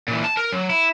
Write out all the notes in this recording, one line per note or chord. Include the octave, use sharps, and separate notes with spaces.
A#2 E3
A5
A#4
F#3
E4